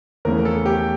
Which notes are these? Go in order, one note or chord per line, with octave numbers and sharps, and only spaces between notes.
E2 C#3 E3 A3 C#4 A#4
A4
G4